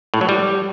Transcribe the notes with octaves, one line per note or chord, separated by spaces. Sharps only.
A2
F#3
G3